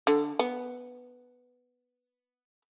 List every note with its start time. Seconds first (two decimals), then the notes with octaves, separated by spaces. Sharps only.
0.07 D3
0.39 B3